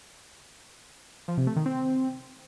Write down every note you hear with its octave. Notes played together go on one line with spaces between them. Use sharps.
F3
C3
A3
D#3
C4